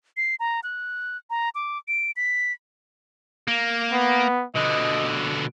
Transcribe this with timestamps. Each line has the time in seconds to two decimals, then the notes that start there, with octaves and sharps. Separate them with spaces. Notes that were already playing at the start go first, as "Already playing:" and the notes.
0.17 C7
0.40 A#5
0.63 F#6
1.30 A#5
1.55 D6
1.88 D7
2.16 B6
3.48 A#3
3.92 B3
4.55 B2 D3 D#5